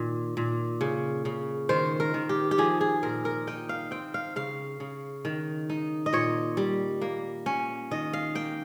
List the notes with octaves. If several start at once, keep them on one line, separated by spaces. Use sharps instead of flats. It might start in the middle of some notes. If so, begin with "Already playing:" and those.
Already playing: A#2 D#3
A#2
C#3
C#3
D#3 C5
A#4
D#3
G4
G4
F3 G#4
G#4
A#2 A#4
A#4
D#4 G5
F5
C4 G5
F5
C#3 F5
C#3
D#3
D#4
D#5
A#2 C#5
G3
A#3
C#4
D#3 D#5
F5
A#3 G5